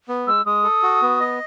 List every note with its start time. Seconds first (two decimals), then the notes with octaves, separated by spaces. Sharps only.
0.09 B3
0.27 G#3 E6
0.46 G#3 D#6
0.64 A4
0.83 F#4
1.02 B3
1.20 D#5